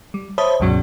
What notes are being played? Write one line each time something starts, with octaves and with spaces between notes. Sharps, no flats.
G3
C5 C#5 E5 A5 B5 D#6
C#2 G2 B2 F#3 C#4